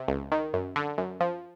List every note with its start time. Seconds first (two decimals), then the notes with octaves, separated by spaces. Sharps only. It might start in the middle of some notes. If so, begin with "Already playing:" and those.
Already playing: C3
0.08 C#2
0.32 D#3
0.53 F#2
0.76 D3
0.98 F#2
1.20 F3